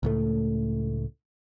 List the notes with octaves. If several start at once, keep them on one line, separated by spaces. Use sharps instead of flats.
C#2 A2 A3